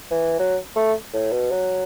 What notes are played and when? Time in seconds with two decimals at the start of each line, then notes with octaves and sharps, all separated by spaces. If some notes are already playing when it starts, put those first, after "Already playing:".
0.11 E3
0.39 F#3
0.76 A3
1.14 A2
1.32 B2
1.51 F#3